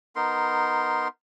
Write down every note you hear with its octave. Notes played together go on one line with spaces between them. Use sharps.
B3 D#4 A#4 C6